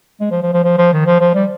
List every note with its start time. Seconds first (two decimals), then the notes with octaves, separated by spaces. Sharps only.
0.20 G#3
0.31 F3
0.43 F3
0.53 F3
0.64 F3
0.78 F3
0.93 D#3
1.06 F3
1.20 F3
1.35 G3